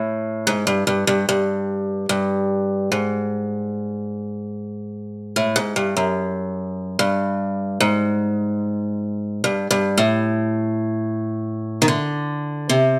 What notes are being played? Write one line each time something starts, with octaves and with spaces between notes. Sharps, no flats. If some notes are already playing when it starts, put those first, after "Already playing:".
Already playing: A2
G#2
G2
G2
G2
G2
G2
G#2
A2
G#2
G2
F#2
G2
G#2
G2
G2
A2
D#3
D3
C3